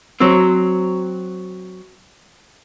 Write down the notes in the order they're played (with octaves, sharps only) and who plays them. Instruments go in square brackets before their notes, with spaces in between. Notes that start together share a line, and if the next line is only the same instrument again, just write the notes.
[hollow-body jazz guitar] F#3 C4